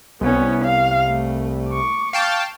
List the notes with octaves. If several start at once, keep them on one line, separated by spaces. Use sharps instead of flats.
C2 B3 C#4
F5
A3
C#6 D6
F5 G5 A5